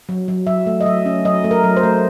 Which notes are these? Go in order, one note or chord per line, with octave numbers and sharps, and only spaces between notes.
F#3
F#3
F#3 E5
A3
D#5
F#3 E5
C#4
F#3 D#5
A3
A#4
F#3
C5
A3